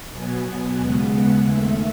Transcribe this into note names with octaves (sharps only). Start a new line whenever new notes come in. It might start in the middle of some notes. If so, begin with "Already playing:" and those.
B2 F#3 B3 G#5
D#2 C#3 G#3 B3 F#5
D#2 D#3 A3 E5